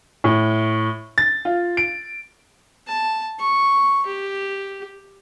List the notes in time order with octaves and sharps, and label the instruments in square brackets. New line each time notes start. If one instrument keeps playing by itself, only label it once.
[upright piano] A2
A6
F4
D7
[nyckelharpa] A5
C#6
G4